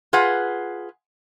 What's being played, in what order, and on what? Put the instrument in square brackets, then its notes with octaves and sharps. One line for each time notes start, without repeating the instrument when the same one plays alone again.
[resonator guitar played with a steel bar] F4 G#4 B4 F#5